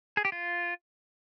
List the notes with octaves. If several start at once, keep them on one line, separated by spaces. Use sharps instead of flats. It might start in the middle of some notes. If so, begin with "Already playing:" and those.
G#4
G4
F4